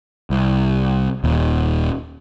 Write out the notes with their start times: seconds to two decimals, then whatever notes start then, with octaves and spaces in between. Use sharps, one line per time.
0.30 C2
1.24 D#1 D#2